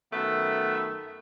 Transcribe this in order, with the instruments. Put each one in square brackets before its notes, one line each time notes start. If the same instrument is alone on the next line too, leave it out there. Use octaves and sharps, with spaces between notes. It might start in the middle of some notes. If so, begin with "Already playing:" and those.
[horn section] F#2 D#3 A3 B3 E5